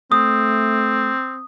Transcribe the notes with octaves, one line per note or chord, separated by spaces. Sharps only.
A3 C4 D#6